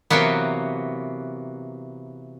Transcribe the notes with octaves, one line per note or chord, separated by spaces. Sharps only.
C3 E3 F#3 A#3 B3